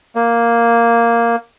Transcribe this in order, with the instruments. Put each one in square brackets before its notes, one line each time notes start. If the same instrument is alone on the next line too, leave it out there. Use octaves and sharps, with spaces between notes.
[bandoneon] A#3